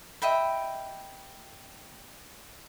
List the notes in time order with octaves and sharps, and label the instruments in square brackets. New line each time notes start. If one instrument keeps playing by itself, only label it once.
[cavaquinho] D#5 E5 G5 B5